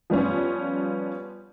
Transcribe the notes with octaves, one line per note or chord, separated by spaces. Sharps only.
F3 G3 B3 C#4